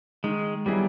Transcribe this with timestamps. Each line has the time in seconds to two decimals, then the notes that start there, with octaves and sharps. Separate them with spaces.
0.24 D#3 G#3
0.66 F#3 G3 B3 E4 G#4